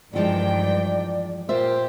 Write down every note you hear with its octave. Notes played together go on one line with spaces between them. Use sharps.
E2 G2 D#3 F3 G#3 D5 G5
A#2 F4 G4 A#4 C5 E5